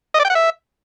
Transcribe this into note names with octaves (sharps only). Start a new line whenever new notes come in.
D#5
D5
G5
F#5
E5